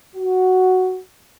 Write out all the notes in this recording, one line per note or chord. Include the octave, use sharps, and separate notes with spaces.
F#4